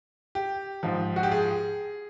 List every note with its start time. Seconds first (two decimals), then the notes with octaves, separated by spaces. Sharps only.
0.35 G4
0.83 G#2 F3
1.16 F#4
1.23 G4
1.31 G#4